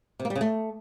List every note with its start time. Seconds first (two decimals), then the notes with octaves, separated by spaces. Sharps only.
0.20 C3
0.25 A#3
0.30 G3
0.35 C#3
0.41 A3